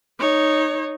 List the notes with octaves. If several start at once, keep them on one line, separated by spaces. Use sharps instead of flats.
D#4 C#5